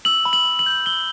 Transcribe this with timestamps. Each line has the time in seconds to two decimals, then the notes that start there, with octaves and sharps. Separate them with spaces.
0.05 E6 F#7
0.25 B5
0.33 F#7
0.45 B5
0.59 F#7
0.66 G6
0.86 E6 G7